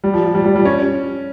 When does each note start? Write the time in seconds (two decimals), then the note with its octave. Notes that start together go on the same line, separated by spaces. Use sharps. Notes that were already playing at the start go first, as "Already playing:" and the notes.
0.04 G3
0.14 F3
0.25 F3
0.35 G3
0.45 G3
0.56 G3
0.65 C#4